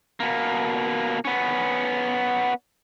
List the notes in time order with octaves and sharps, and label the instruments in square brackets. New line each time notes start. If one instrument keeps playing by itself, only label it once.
[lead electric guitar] B2 A#3
B3 C#4